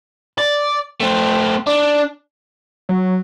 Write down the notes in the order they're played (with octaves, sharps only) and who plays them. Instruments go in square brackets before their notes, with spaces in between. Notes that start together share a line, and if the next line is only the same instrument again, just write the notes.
[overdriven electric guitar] D5
A3 C4
D4
[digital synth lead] F#3